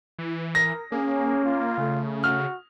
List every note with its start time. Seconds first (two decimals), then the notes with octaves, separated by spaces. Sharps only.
0.18 E3
0.55 A#4 A#6
0.92 A#3 C#4 G#4
1.45 F4
1.78 C#3 A3
2.24 F#4 F6